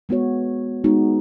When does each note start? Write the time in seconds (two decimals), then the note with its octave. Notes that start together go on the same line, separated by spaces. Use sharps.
0.09 G#3 B3 F#4 C#5
0.84 G#3 B3 D#4 F#4